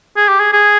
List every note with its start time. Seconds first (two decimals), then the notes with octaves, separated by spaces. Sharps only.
0.17 G#4
0.29 G4
0.40 G#4
0.53 G#4